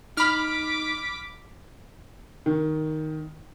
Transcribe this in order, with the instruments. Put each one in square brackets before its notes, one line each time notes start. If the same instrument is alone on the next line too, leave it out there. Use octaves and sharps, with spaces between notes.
[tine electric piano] D#4 [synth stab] B5 F6 [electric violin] D6 B6
[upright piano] D#3